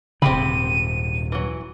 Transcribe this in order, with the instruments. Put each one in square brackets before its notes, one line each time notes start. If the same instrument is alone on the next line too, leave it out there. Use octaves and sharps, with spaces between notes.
[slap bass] D#1 G#2 [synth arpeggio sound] C#3 [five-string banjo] C4 G4 B5 [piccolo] D#7
[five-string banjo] E3 F#3